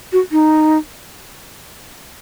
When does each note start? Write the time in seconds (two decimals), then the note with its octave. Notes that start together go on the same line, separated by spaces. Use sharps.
0.12 F#4
0.32 D#4